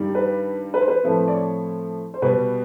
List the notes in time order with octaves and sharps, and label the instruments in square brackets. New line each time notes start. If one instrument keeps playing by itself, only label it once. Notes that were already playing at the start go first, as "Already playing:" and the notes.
Already playing: [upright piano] G2 D#3 G3
B4
B4
C5
B4
A2 F3 A3 C4
D5
C#5
C5
B2 G3 B3 B4